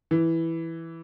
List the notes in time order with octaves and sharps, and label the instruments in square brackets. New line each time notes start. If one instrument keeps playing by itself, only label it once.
[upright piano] E3